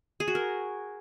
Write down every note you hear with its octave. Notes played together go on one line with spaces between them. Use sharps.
G#4
F#4
A#4